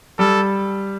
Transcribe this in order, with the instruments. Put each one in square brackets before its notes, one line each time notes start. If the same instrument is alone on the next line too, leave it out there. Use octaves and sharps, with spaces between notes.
[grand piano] G3 [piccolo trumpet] A4